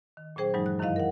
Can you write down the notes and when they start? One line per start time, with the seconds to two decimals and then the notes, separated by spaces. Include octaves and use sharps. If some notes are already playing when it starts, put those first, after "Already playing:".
0.17 D#3
0.36 A#2 F#3 C#4 G#4 C5 G5
0.54 G2 E3 F#3 G#3 D#4
0.66 F#6
0.79 F#2 D#3 F#3 E4 D#5 F5
0.96 A#4 F5 F#5